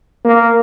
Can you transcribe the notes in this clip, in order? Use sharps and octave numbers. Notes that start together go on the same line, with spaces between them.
A#3